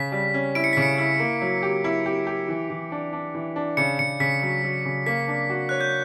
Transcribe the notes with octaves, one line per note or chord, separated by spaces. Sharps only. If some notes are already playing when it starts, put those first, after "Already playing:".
Already playing: C#3 B6
G3
C#4
E4 D7
C#7
C#3 B6
C#7
E4
A#3
F#3
G4
E4
G4
G4
E3
E3
D4
D4
E3
D4
C#3 C#7
C#3 C#7
C#3 B6
F#3
F#3
C#3
A#3 B6
D4
F#4
C#5 F#6
G6